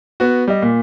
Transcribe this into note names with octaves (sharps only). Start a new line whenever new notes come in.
B3 F#4
G3 D#5
A#2